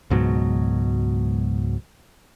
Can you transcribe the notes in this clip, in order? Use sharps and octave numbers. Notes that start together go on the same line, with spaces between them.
C#2 G#2 B2 F#3